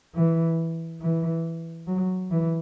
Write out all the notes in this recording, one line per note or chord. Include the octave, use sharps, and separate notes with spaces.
E3
E3
F#3
E3